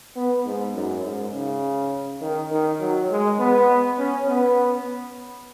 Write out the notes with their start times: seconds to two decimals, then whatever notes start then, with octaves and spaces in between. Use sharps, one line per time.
0.16 B3
0.46 G#2
0.75 F#2
1.04 G#2
1.34 C#3
2.22 D#3
2.52 D#3
2.81 F#3
3.10 G#3
3.39 B3
3.98 C#4
4.28 B3